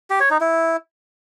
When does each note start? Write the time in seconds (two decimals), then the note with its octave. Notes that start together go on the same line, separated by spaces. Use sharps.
0.10 G4
0.20 C#5
0.30 D#4
0.41 E4